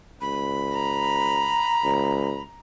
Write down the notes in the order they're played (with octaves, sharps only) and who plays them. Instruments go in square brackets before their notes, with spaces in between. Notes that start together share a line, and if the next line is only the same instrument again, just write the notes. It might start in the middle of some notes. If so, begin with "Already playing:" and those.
[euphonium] C#2 [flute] B5
[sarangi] A#5
[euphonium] C#2